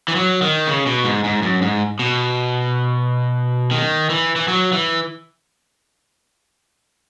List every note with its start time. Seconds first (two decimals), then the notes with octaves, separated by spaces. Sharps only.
0.08 E3
0.15 F#3
0.42 D#3
0.67 C#3
0.86 B2
1.04 G#2
1.24 G#2
1.42 F#2
1.62 G#2
1.99 B2
3.71 D#3
4.10 E3
4.36 E3
4.48 F#3
4.72 E3